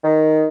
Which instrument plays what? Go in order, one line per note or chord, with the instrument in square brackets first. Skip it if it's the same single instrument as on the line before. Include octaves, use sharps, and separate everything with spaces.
[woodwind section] D#3